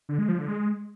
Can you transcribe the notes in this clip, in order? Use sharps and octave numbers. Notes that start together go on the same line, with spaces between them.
D3
G#3
F3
D3
G#3